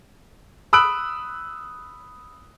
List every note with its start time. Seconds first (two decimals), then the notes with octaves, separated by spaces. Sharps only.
0.73 B5 D#6 E6 F#6 D7 F#7